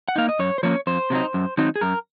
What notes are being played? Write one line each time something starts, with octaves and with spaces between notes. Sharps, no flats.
F#5
A#3 D#4 F5
D#5
F#2 C#5
C5
F3 A#3 C#4 C#5
F2 C5
C3 F#3 C4 D#4
F#2
D#3 F#3 C4 D#4
G#4
F#2 A#4